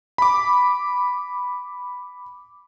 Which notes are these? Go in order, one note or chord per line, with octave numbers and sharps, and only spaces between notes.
B5 D6